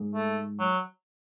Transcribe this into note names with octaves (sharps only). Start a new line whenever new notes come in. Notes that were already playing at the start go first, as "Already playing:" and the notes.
Already playing: G#2
A3
F#3